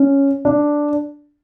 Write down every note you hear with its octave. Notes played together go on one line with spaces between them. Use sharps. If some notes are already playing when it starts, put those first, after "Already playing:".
Already playing: C#4
D4